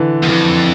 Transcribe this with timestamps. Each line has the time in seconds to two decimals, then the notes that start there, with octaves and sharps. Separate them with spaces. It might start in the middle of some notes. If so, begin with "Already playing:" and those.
Already playing: D3 E3
0.23 E2
0.28 F2 E3